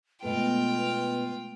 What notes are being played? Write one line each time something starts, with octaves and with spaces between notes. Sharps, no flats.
B2 G#3 A3 B3 F4 A4 B4 G5